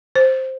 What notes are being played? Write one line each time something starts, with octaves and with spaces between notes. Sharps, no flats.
C5